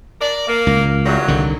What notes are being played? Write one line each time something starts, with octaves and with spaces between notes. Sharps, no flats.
A#4 D5
A#3
C#2
E2 G2 F#3
C2 D3 D#3